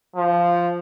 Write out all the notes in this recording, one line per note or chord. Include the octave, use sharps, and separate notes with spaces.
F3